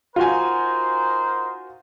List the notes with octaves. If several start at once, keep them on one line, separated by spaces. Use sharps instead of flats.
D#4 F4 F#4 A#4 C5 G#5